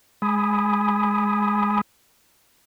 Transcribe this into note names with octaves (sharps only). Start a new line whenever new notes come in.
G#3 G#5 B5 D#6